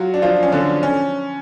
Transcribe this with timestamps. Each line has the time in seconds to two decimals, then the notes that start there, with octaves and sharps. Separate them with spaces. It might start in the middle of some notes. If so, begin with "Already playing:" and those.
Already playing: F#3 F4 F#4
0.14 D4
0.22 F3 F4
0.43 C#4
0.52 D3 D4
0.83 C#4